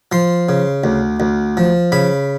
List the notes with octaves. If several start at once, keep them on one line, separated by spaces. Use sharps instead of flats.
F3 C6
C#3
D2
D2
F3
C#3 B5